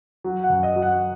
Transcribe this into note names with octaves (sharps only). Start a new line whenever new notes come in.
F#3
F#5
F#2
D#5
F#3
F#5